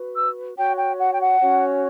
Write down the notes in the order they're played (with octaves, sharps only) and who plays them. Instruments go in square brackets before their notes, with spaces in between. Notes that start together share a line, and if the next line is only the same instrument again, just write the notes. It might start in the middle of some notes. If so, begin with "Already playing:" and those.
Already playing: [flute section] F#4 B4
E6
F#4 C#5 G5
G5
F#5
G5
F#5
C#4 F#4 C#5